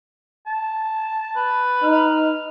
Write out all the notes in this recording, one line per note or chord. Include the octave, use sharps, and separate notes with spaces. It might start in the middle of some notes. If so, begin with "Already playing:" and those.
A5
B4
D#4 F6